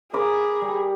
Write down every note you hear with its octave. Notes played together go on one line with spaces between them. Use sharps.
G#4 A#4 B5 D6
G3